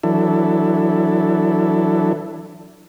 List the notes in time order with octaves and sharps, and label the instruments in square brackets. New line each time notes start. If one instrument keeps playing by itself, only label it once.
[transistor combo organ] E3 F#3 D4 E4 A4